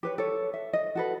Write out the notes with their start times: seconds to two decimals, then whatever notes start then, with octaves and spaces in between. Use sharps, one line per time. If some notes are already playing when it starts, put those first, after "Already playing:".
0.03 G4 B4 C#5
0.18 A4 C#5
0.54 E5
0.73 D#5
0.95 F#4 A4 B4